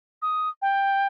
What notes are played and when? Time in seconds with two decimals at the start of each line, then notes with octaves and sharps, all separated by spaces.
0.22 D#6
0.62 G5